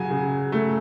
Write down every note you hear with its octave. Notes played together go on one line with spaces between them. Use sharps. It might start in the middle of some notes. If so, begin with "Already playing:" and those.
Already playing: C#3 F#3 G#5
C#3
A3